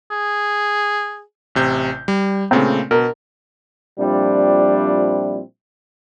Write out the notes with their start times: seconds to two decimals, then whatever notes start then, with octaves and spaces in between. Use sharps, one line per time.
0.11 G#4
1.55 A1 C3 G6
2.08 G3
2.51 A#2 C#3 A3 C4
2.91 B2 A#4
3.99 A#2 F3 G3 C4 D4 E4